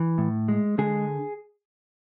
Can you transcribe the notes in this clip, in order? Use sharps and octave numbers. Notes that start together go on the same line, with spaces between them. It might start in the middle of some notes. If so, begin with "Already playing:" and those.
Already playing: E3
A2
G#3
D3 G#3 G#4